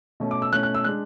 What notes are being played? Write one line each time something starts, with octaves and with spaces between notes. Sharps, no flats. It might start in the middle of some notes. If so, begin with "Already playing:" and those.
B2 A3 C#4
D6
E6
B2 A3 C#4 F#6
F#6
E6
G#3 D4 F#6